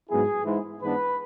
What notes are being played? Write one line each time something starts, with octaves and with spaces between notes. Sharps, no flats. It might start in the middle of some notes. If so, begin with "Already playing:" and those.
G#2 F#3 B3 E4 G#4
G#2 E3 G#3
G#2 E3 B3 D4 B4